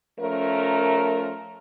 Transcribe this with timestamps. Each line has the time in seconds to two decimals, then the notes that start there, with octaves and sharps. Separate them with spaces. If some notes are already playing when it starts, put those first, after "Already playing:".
0.20 F3 A3 C#4 A#4